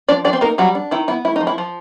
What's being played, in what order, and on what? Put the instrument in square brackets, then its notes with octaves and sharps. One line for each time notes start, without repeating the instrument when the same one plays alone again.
[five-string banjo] F3 D4 D5
F3 D4 D5
C4 C5
A#3 D#4 A#4
F#3 G3 F#4
D4
D#3 E4
B3 E4
A3 E4
D#4
F3
E4
F3